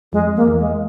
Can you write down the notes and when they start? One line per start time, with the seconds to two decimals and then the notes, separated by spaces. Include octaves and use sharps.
0.12 F2 G#3
0.36 A#3
0.48 E2
0.59 G#3